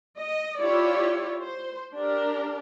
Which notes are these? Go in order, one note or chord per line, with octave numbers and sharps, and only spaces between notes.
D#5
E4 F4 G4 C#5 D5
C5
D4 G4 A#4